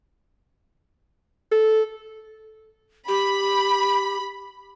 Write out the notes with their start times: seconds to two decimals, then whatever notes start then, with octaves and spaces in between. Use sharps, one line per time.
1.52 A4
3.08 G4 B5